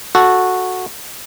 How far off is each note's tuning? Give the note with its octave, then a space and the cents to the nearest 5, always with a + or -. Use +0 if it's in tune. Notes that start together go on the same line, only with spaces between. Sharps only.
F#4 -10 A4 +0